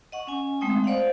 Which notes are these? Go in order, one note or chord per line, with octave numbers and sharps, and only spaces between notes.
D#5 F#5 C#6
C#4 G#5
G#3 A3 C4 G5 D#6
C5 D5 D#5 F5 F#5